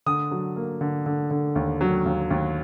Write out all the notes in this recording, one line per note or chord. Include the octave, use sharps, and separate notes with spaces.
D3 D#6
F#3
A#3
D3
D3
D3
D#2
F#3
D#2
D#2